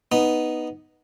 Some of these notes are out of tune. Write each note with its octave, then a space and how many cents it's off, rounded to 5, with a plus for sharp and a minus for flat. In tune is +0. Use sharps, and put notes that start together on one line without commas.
B3 +0 D#4 +0